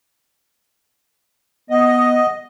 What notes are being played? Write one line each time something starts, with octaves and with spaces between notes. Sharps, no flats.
B3 D#5